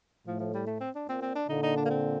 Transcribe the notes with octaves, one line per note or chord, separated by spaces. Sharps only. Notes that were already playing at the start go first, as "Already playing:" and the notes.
A2 F3
F3
G3
A3
C4
D4
A#2 C4
C4
D4
A#2 D3 D#4
D#4
D4
A#3
C4